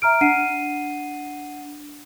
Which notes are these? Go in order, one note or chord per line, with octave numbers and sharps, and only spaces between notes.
E5 A#5 F6 D7
D4 F#5 C7 D#7